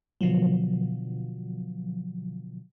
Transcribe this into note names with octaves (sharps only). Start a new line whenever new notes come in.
B2 D3 F3 F#3